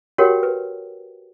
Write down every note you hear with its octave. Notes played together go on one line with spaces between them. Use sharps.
F#4 G4 A#4 C#5 F#5 G5
B4